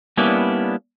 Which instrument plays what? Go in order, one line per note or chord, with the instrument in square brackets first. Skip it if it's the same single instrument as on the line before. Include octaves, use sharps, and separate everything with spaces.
[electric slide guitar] G3 A#3 B3 C#4 D4 E4